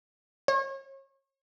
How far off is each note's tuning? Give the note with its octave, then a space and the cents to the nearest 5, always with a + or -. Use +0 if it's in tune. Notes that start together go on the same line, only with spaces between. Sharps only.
C#5 -35